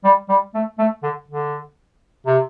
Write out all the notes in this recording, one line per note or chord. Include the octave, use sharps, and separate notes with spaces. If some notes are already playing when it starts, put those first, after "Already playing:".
G3
G3
A3
A3
D3
D3
C3